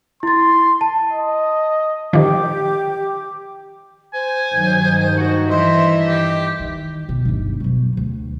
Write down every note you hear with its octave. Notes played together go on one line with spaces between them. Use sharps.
E4 C6 A6
A5
D#5
D#3 F3 G4 D6
C5 G#5
G2 D#3 F#3
F#4
E3 C5 D#5 E5
G4
D#3
B2
G1 D#2
B2 F#3
D2